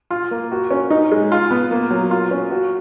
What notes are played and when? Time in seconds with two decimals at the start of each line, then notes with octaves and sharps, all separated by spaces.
0.10 F4
0.31 A#3
0.52 F#4
0.71 C#4
0.90 D#4
1.12 G#3
1.32 F4
1.51 B3
1.71 A#3
1.91 F#3
2.11 F4
2.31 C#4
2.51 F#4